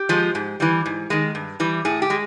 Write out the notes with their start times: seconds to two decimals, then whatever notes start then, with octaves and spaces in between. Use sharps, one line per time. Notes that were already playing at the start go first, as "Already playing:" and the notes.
Already playing: G4
0.09 F3 G#3
0.35 G#2
0.60 E3 G3
0.86 G#2
1.10 D#3 G#3
1.35 G2
1.60 E3 G3
1.85 A2 G#4
2.02 G4
2.10 G#3